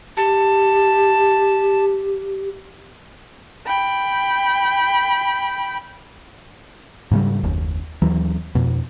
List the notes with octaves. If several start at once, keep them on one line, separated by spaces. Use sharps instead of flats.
G4 A5
G5 B5
G#2 C#3 F#3 G3
F#1 D#2
D#2 E3 F#3
F2 B2